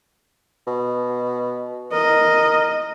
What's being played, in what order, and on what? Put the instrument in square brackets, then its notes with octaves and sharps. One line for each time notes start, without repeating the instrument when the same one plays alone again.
[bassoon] B2
[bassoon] A#4 [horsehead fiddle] D#5